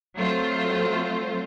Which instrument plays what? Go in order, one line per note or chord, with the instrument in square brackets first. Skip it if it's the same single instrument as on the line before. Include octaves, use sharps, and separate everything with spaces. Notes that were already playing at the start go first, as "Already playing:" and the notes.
[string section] F#3 A3 C4 F4 C5